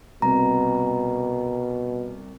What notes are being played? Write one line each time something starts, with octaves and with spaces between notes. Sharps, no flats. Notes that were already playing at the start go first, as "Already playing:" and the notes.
C2 B2 A#5